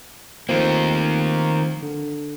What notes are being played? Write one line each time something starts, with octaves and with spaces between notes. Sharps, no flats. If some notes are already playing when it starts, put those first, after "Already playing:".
D#3 F3 A3 A#3 C4
D3